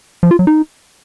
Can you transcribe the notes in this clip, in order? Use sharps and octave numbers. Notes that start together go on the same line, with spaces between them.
F3
F4
F#3
D#4